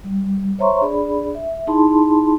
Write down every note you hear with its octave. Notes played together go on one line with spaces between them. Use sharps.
G3
C5 C#5 E5 A#5 C6 C#6
D4 G#4 D5 B5
E5
D#4 E4 G#4 A5 B5 C6